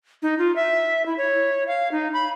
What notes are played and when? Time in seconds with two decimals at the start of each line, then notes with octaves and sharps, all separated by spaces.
0.22 D#4
0.39 F4
0.56 E5
1.06 E4
1.18 C#5
1.67 F5
1.92 D#4
2.13 B5